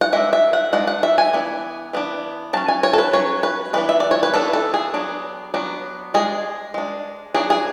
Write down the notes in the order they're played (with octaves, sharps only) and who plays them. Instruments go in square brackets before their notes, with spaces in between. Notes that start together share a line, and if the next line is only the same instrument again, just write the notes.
[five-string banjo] F#5
G#3 D4 E5
E5
F#5
G#3 D4 F#5
F#5
E5
G#5
E3 B3 D4
E3 B3 D4
F#3 C#4 A5
G#5
C#5
A4
B4
F#3 C#4 C#5
B4
E3 B3 D4 B4
E5
D5
C#5
B4
E3 B3 D4 A4
A4
G#4
F#3 B3 D4
F#3 B3 D4
G#3 D4 G#4
G#3 D4
F#3 B3 D4 G#4
G#4